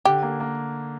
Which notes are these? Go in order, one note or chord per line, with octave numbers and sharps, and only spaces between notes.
D3 G4
A#3
A#3